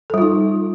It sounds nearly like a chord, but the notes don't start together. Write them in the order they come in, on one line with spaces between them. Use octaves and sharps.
A4 G3 F4 D#4